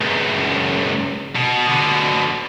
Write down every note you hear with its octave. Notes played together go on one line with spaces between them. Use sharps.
C#2 F#2
B2
B2 D3